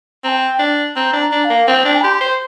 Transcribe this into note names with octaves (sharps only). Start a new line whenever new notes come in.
C4 G5 A#5
D4
C4 A#5
D4
A#5
D4
F5
A#3
C4 G5
D4
G4 C6
C5